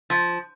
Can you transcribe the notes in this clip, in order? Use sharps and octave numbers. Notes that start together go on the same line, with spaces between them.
F3